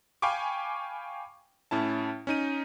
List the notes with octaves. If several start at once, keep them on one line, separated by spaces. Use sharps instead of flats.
F5 G5 G#5 B5 C#6 D6
A2 C#4 E4 A5
C#4 D#4 D#7